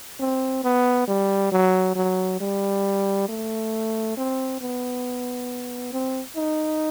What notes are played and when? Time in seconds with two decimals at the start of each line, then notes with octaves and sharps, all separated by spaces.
0.20 C4
0.64 B3
1.08 G3
1.52 F#3
1.96 F#3
2.40 G3
3.29 A3
4.17 C4
4.61 B3
5.93 C4
6.36 D#4